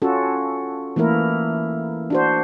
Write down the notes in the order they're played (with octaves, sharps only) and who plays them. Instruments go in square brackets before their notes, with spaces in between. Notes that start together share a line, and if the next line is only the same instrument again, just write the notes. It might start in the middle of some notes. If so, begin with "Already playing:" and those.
[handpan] C#4 F4 F#4 A4
E3 A3 A#3 E4 A#4
D4 F#4 C5